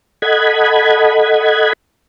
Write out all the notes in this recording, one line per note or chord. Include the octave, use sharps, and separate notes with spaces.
A4 D#5 F#5 B5 G#6